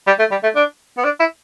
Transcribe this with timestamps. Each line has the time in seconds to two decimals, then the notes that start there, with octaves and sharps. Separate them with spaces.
0.07 G3
0.19 A3
0.31 G3
0.43 A3
0.56 D4
0.97 B3
1.04 D4
1.20 E4